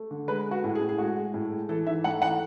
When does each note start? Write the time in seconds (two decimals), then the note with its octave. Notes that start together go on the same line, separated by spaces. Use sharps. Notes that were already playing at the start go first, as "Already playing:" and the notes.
Already playing: A3
0.11 D3
0.28 G#3 B4
0.46 G#3
0.51 F#4
0.64 A2
0.75 G#4
0.81 A2
0.89 G#4
0.98 G#3 F#4
1.17 G#3
1.34 A2
1.51 G#3
1.69 E3 A4
1.87 G#2 E5
2.04 A3 F#5
2.22 E3 F#5